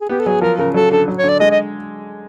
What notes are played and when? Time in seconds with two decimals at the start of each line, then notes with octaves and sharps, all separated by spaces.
0.01 G#4
0.09 B3 G4
0.19 A4
0.26 F#3 G#4
0.41 F3 A#4
0.58 C#3 A#4
0.74 F#3 A4
0.92 D3 A4
1.08 F#3
1.18 C#5
1.23 D3 D5
1.40 G#3 D#5
1.51 D#5